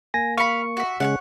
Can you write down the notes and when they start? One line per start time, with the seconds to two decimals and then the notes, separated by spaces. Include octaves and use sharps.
0.14 A#3 G#5 A#6
0.38 F5 B5 C#6 C#7
0.77 F#4 E5
1.00 C#3 G#3 C#4 C#5 F5 F#5